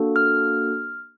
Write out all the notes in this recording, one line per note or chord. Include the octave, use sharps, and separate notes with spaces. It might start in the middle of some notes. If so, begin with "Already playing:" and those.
Already playing: A#3 D4 F#4 A4
F6